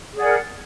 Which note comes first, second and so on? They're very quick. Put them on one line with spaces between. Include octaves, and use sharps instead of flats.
G#4 D5 F#5 A#4